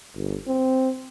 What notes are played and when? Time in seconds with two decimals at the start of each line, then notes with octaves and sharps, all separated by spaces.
0.16 G1
0.48 C4